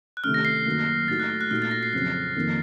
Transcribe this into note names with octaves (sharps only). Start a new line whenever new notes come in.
F#6
C3 D#3 A3 C#4 F6
A#6
C7
F#2 D#3 F#3 A#3
A2 A3 D#4 F#4 A6
F#6
F6
F#6
A#2 A3 D#4 F#4 F6
A6
A#6
C7
F2 C#3 F#3 C4 C7
F2 D#3 A#3